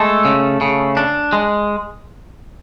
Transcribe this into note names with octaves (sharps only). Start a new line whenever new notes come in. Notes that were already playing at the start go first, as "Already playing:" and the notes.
Already playing: G#3 A3 A4
C#3
C#3
D4
G#3